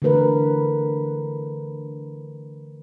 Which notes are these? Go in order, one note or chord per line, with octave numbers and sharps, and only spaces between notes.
D3 E3 A3 A#4 B4